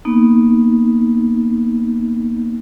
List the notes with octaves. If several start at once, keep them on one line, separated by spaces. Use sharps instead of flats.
A#3 B3 D#4